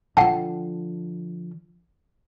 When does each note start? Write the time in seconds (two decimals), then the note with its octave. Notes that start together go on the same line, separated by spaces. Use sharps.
0.17 D3 F3 F#5 G5 A5